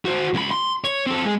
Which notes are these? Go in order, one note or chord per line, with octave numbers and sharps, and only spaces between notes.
F#4 C5
C#2 B5
C6
C#5
C4 A4
G#3